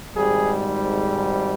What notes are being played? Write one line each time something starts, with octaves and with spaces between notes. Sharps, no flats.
G#1 G#2 G3 G#4